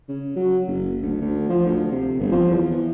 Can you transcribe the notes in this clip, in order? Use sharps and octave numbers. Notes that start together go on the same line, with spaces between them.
C#3
F#3
F#1
D2
D2
F3
D2
C3
G1
F3
E2
E3